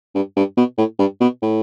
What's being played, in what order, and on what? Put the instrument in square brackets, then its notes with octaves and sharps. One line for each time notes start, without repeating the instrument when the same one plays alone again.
[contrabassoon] G2
G2
B2
A2
G2
B2
A2